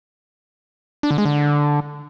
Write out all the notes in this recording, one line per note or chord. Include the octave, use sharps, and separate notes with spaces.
D4
D3
G#3
D3